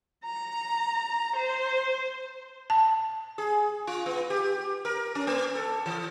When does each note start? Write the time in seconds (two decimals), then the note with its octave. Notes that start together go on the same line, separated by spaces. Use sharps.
0.25 A#5
1.36 C5
2.70 A5
3.38 G#4
3.87 F4
4.06 B3
4.30 G4
4.85 A#4
5.15 C#4
5.27 A#3
5.55 A4
5.86 E3